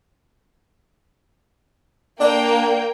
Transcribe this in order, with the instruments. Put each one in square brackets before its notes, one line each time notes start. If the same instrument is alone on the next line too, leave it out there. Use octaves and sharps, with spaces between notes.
[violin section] A#3 G5 [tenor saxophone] D4